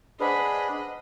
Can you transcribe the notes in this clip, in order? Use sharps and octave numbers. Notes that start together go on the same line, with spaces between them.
D4 G#4 B4 C5 D#5 F#5 B5